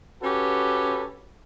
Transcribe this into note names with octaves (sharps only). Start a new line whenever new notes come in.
C#4 F#4 G4 A4 B4